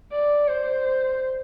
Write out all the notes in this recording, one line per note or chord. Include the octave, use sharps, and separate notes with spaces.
D5
C5